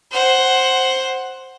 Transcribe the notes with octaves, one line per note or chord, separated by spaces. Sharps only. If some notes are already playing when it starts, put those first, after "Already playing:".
C5 F#5